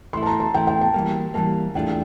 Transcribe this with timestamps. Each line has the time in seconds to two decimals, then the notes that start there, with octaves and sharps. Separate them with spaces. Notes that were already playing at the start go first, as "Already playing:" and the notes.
0.13 E3 A3 E4 C6
0.23 A5
0.26 A#5
0.40 A5
0.54 E3 A3 E4 G5
0.67 G5
0.81 A5
0.94 E3 G3 A#3
1.34 E3 G3 A#3 A5
1.74 E2 E3 A3 D4 F4 G5